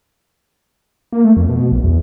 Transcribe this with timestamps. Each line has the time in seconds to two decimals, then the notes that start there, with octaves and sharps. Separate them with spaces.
1.13 A#3
1.25 A3
1.37 F2
1.49 B2
1.72 A#1
1.84 E2